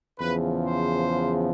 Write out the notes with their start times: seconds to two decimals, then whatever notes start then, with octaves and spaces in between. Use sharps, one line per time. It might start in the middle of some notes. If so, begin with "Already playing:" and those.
0.19 E2 C#3 F3 B4
0.66 C5